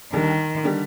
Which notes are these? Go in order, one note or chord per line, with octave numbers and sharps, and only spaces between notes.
D#2 D3 D#3 G3
D3 G3